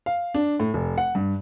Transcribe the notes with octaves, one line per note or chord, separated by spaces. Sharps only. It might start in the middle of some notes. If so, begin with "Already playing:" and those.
F5
D4
A2
F1
F#5
G2